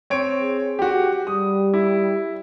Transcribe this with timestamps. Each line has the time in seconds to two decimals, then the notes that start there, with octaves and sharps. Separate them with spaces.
0.10 C4 C#5 D7
0.43 G#4
0.79 F#4 G4
1.27 G3 D#6
1.74 E4